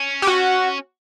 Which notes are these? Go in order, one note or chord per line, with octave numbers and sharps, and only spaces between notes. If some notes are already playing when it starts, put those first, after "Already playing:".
Already playing: C#4
G4
F#4